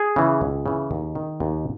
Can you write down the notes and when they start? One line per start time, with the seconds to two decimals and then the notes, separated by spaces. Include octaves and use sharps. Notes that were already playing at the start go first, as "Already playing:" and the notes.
Already playing: G#4
0.16 C#3 E3
0.41 C#2
0.66 C#3 E3
0.91 D#2
1.15 D#3
1.40 D#2